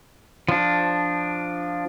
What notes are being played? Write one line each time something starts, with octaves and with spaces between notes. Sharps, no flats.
F3 D4